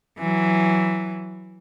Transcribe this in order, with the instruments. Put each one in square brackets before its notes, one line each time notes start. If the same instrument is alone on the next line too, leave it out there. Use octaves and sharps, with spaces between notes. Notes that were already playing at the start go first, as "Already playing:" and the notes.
[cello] E3 F#3